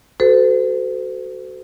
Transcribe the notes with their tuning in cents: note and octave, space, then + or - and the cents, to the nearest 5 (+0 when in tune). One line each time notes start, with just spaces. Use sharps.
F#4 +15 A4 +0 C5 -45